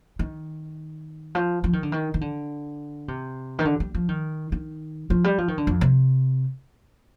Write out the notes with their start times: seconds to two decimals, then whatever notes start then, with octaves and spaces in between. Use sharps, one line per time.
0.19 D#3
1.35 F3
1.64 F3
1.73 D#3
1.83 D3
1.92 D#3
2.14 D#3
2.21 D3
3.08 C3
3.59 D#3
3.65 D3
3.80 G3
3.94 F3
4.09 D#3
4.52 D#3
5.10 F3
5.24 G3
5.38 F3
5.48 D#3
5.58 D3
5.67 F2
5.81 C3